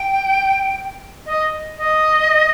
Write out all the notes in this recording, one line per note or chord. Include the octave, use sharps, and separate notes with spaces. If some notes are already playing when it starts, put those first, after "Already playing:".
Already playing: G5
D#5
D#5